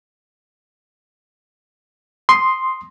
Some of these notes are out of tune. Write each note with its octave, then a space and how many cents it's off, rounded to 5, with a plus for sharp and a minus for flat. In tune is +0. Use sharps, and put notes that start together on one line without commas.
C6 +0 D#6 +0